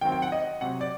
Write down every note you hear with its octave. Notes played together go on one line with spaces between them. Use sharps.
D#3 F#3 C4 G5
G5
F#5
D#5
C3 F#3 C4 F#5
D5